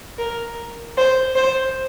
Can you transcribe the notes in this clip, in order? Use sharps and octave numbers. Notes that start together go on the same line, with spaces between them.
A#4
C5
C5